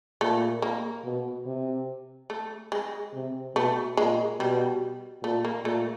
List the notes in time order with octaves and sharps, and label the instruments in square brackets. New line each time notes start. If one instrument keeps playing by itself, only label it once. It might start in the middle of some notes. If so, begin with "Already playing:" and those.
[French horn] A#2 [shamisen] A3
[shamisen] A#3
[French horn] B2
C3
[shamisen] A3
G#3
[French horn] C3
[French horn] B2 [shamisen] A3
[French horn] A#2 [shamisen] G#3
[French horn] B2 [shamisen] G3
[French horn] A#2 [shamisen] A3
[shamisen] A#3
[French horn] A#2 [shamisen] A3